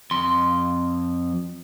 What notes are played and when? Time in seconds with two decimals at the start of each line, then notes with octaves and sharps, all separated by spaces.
0.11 F2 C6